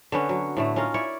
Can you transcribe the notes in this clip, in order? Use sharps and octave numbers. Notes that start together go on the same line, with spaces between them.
D3 B3 C#4
F#3
A2 D3 A3
C#4 D#4 F4 A#4
E4 C#5 D5